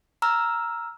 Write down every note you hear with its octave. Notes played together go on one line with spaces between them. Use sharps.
A#5 E6 F6